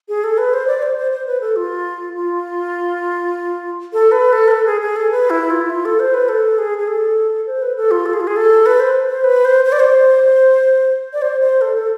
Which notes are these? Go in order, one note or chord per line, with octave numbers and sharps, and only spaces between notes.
G#4
A4
B4
C5
D5
C5
C5
C5
B4
A4
F4
F4
A4
B4
A4
B4
A4
G#4
G#4
A4
B4
E4
F4
E4
F4
A4
C5
B4
A4
G#4
G#4
A4
C5
B4
A4
F4
A4
G#4
F4
G#4
A4
B4
C5
C5
B4
C5
C5
D5
C5
D5
C5
C5
A4
A4